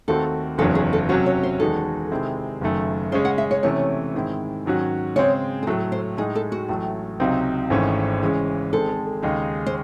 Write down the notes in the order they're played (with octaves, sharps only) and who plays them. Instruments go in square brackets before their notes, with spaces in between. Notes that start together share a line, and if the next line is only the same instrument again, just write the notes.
[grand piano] D#2 D#3 A3 C4 F#4 [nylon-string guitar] A4
[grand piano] F#1 E2 D#3 F#3 C#4 [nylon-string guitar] A4
[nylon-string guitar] G#4
A4
[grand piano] C3 F#3 C#4 F#4 [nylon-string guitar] C5
[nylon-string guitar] C#5
C5
[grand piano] E2 D#3 G#3 D#4 F#4 [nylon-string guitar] A4
[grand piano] C3 D#3 G#3 C4 E4
F#1 F#2 D#3 A3
[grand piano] C#3 G#3 C#4 [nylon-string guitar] C5
[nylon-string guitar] F#5
E5
C#5
[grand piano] C3 E3 A3 C#4 [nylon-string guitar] C#5
[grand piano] G#2 D#3 G#3 C4 E4
G#2 D#3 F#3 C#4 F#4
[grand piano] C#3 G#3 C4 [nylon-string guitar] C#5
[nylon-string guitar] G#4
[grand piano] A2 F#3 A3 [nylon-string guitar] A4
[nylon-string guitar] C5
[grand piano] A2 G#3 D#4 [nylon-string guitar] G#4
[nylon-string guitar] A4
F#4
[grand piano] A1 A2 F#3 A3
C#2 C3 F#3 C4 D#4
G#1 G#2 E3 A3 C#4
C#3 E3 G#3 C#4
[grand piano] D#3 G#3 C4 [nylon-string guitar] A4
[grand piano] D#2 C#3 G#3 D#4
[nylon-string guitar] C5